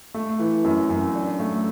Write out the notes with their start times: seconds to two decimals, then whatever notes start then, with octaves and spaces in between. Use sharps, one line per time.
0.14 A3
0.39 E3
0.64 F#2
0.90 F#2
1.15 D4
1.40 A3